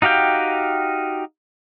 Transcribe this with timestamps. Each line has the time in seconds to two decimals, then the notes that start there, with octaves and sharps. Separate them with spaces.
0.02 D#4 F#4 G4 F5 G5